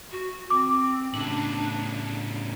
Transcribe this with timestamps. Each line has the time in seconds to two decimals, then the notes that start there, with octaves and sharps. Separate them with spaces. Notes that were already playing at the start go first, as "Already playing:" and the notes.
0.12 F#4
0.50 C4 D6
1.14 A2 C#3 D4 F#7